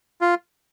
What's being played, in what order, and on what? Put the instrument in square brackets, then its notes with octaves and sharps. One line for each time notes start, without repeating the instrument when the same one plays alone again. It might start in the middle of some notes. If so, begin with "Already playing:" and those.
[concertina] F4